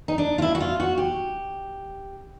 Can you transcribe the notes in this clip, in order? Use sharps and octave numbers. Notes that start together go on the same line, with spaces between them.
D#4
D4
F4
E4
F#4
F4
F#4
G4